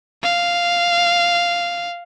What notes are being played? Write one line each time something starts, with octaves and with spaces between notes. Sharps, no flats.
F5